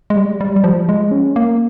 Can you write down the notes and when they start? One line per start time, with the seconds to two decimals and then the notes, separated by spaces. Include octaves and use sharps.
0.10 G#3
0.16 G3
0.41 G3
0.56 G3
0.64 F3
0.89 G#3
1.11 C#4
1.36 A#3